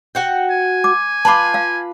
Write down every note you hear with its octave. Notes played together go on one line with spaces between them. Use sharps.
F#4 F#5 G5
G#5
D6
F4 B4 A5 B5 D6
F5